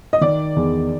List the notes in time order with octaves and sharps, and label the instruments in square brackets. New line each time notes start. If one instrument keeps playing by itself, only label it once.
[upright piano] D#5
[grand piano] D#3 [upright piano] D5
[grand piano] E2